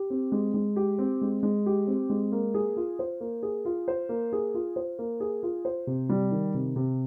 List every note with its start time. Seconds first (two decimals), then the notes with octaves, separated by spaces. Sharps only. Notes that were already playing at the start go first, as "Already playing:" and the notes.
Already playing: G4
0.10 C4
0.32 G#3
0.54 G#3
0.76 G4
0.99 C4
1.22 G#3
1.43 G#3
1.66 G4
1.87 C4
2.10 G#3
2.32 A#3
2.54 G#4
2.77 F4
2.99 C5
3.21 A#3
3.43 G#4
3.65 F4
3.88 C5
4.09 A#3
4.32 G#4
4.54 F4
4.76 C5
4.99 A#3
5.20 G#4
5.43 F4
5.65 C5
5.87 C3
6.09 G3
6.31 D#3
6.54 C3
6.76 C3